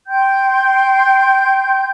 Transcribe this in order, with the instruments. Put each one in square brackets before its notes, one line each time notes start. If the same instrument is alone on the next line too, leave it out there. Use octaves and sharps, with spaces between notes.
[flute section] G5 C6 G6